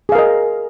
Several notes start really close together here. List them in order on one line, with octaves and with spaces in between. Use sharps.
G#4 F5 A#4 D#5